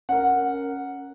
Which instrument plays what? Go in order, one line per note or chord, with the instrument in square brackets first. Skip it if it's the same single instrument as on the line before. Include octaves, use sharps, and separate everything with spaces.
[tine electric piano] C#4 A#4 [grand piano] F#5